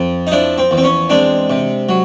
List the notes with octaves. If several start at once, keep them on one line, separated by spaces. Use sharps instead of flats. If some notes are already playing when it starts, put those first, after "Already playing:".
Already playing: F2
D#4
F3 D4 E4
C4
E2
C4
C#4
G#3 C4 D4
C3
F#3